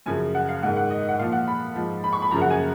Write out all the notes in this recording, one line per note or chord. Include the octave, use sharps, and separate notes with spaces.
F#2 C#3 F3 G#5
F#5
F5
G#2 D#3 F#5
F#5
D#5
F#5
A#2 F3 F5
F#5
B5
G#2 F3
B5
C#6
B5
F#2 C#3 F3 A#5
F#5
G#5